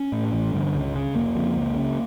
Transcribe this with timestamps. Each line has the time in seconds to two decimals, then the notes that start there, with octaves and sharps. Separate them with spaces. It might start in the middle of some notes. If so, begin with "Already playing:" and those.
Already playing: C#4
0.12 A2
0.33 A1
0.53 G2 D3
0.74 C#2
0.95 C#3
1.15 F1 A#3
1.36 F2 C#3
1.56 C#2
1.76 C#3